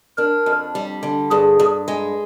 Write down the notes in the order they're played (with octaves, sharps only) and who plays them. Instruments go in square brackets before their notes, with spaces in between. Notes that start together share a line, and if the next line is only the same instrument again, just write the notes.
[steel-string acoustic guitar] D4 [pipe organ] A#4
[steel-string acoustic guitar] F2
G3
D3
[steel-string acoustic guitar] G2 [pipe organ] G#4
[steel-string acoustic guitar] G2
G#3